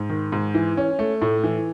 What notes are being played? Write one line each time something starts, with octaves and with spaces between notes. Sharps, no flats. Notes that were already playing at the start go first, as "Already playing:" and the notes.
Already playing: G#2
D#3
G#2
E3
C#4
A3
A2
E3